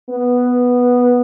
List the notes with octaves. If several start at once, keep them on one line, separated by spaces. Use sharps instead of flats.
B3